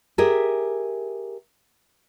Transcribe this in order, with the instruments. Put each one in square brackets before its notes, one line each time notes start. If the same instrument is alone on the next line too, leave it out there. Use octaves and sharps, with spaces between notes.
[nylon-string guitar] G4 G#4 A#4 E5